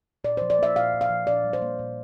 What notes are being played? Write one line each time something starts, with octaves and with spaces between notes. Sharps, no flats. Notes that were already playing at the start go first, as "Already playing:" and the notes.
A#2 D5
F3 C5
D5
A#3 E5
A#2 F5
A#2
F5
F3
A#2 D5
G3
C5
A#3
A#2